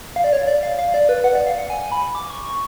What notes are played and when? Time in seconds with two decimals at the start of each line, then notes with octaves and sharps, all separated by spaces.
0.16 F5
0.24 D5
0.33 C#5
0.47 D5
0.63 F5
0.79 F5
0.94 D5
1.09 B4
1.24 F#5
1.35 D5
1.47 F5
1.58 F#5
1.70 G#5
1.92 B5
2.15 D6
2.30 C#6
2.45 C#6